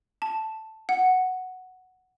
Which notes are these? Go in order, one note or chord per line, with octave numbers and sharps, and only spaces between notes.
A5
F#5